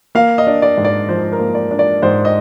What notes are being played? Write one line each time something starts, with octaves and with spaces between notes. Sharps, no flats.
A#3 F5
D#5
D4
D5
G#2
D5
F3 C5
A#4
A#3
D5
D4
D5
G#2 C5
D#5